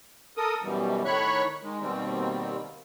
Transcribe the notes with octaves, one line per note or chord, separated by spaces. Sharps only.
A4 A#4 D#6
F#2 B2 E3 G3
A2 D#3 C#5 B5 C#6 F#6
D#3 G#3
D#2 B2 D#3 G3 C4